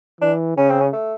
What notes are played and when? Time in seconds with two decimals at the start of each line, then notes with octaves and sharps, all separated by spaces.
0.21 E3 D4
0.57 C#3 C#4
0.70 C4
0.81 C#4
0.93 A3